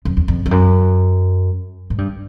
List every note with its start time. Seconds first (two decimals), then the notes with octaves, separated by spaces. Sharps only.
0.05 F2
0.17 E2
0.28 F2
0.46 F2
0.51 F#2
1.90 G#2
1.98 G2